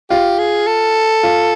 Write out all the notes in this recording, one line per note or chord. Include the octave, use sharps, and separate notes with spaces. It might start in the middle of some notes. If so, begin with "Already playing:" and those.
F4 G4
G#4
A4
F4